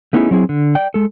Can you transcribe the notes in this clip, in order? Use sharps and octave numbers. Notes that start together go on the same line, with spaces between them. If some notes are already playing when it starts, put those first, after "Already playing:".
A3 B3 C#4 D#4 E4 G#4
F#3 C4 E4 G#4
D3
D5 G5
G#3 A4